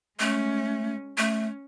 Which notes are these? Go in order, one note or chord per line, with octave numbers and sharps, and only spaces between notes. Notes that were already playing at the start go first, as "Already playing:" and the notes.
G#3 A3 C#4
A3 C#4